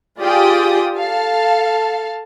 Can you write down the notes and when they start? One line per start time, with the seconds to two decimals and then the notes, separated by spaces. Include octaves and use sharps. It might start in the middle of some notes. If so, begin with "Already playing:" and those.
0.19 F4 G4 G#4 D5 G5 D#6
0.97 A4 F5 A5